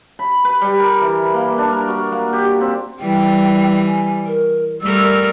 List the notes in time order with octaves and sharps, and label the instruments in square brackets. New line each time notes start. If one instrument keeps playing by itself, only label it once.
[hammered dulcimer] B5
B4
G3
A#4
E3
A#3
D4
A#4
F#4
A#3
G4
C4
[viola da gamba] E3 G3 [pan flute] G5
[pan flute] G#5
A#4
[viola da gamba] G3 A3 A#4 [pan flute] E6